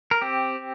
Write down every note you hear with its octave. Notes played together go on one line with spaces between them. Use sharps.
A#4
C4 G4